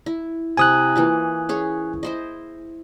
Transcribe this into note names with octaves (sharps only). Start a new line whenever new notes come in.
E4
C3 E4 G#5 D#6 F#6
E3 A#3 F4
C#4 G#4 C#5
E4 C5 D#5